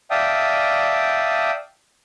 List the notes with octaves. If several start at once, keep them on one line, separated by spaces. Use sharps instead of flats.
D5 E5 F5 G5 A5 D#6